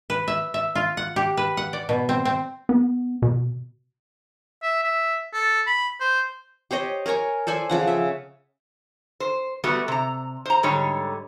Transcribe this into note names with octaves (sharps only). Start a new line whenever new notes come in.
B4
E5
E5
F4
F#5
G4
B4
F#5
D5
B2
C4
C4
B3
B2
E5
E5
A4
B5
C5
G4 C5 C#5 D#5
A#4 C#5 G#5 A#5
A4 C5 D5 G#5
C#3 F3 F#5
E5
C5
G3 A3 B3 F#4
C3 A#5
C5 A#5
G#2 D3 G3 C#5